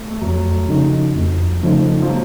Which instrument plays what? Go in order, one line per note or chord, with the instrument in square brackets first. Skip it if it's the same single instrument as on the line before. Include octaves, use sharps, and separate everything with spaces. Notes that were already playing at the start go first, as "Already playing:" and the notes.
Already playing: [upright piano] A3
A3
[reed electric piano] F2 [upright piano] F#3
[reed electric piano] C#3 F3 A3 D#4
F2
C#3 F3 A3 D#4
[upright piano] F3
F#3